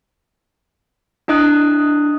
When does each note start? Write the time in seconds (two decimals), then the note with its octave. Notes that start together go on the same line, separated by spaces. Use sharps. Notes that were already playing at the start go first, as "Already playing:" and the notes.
1.28 D4 E4 D#5 D#6 F#6